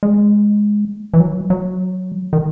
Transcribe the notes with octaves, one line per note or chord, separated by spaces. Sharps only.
G#3
E3
F#3
F#3
D#3